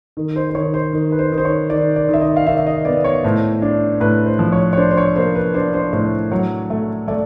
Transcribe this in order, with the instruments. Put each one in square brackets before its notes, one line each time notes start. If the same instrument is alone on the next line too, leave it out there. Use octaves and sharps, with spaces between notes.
[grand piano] D#3
C5
C5
D#3 C#5
C5
D#3
B4
C5
D#3
C5
C#5
D#3 D5
D5
D#3 E5
D#5
F5
D#3 E5
E5
D#5
B3 D5
C#5
A2 C5
D4
A2 B4
C5
F3
C#5
C#5
D4 C5
C5
C#5
A#3 C5
B4
D4 C5
C5
A2 C5
F#3 C#5
A3
A3 D5